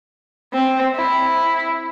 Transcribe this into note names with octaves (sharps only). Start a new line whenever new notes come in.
C4
E4